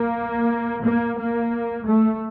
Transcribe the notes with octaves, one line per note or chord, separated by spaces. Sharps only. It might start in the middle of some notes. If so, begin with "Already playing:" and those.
Already playing: A#3
A#3
A#3
A3